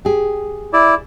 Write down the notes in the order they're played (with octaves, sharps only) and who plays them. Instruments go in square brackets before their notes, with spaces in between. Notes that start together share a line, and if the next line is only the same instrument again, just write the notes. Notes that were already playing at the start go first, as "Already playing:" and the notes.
[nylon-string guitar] G4 G#4
[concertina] E4 D5